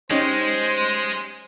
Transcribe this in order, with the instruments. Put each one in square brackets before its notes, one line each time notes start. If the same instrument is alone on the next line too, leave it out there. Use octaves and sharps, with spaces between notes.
[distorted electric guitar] G#3 [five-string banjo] C#4 D#4 G4 [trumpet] C5